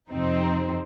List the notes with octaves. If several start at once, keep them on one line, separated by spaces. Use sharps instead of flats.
F2 C3 F3 C4 D#4